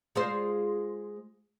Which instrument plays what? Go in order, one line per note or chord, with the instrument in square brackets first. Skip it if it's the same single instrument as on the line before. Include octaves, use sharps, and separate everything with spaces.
[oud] G#3 F4 C5